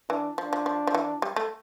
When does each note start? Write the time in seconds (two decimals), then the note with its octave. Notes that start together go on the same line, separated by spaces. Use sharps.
0.10 E3 D4
0.38 F3 D4
0.53 F3
0.66 F3
0.87 F3
0.94 E3
1.22 G3
1.36 A3